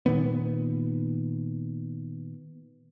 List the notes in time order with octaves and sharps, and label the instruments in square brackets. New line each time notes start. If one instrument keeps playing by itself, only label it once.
[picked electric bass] A#2 D#3 B3